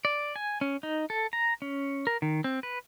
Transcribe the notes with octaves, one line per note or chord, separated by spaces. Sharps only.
D5
G#5
C#4
D#4
A4
A#5
C#4
A#4
D#3
C4
B4